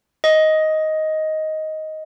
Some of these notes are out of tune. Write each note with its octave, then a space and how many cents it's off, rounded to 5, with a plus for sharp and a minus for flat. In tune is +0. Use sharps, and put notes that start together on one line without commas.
D#5 +10